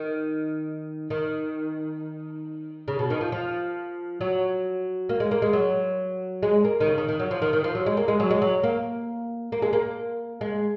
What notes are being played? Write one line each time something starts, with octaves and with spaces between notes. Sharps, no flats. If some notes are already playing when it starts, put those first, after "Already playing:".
Already playing: D#3
D#3
C#3
B2
D#3
F3
F3
F#3
A#3
G#3
A#3
G#3
F#3
G#3
A#3
D#3
C#3
D#3
D#3
F#3
F3
D#3
D#3
F3
F#3
G#3
A#3
G#3
F#3
G#3
F#3
A#3
A#3
G#3
A#3
G#3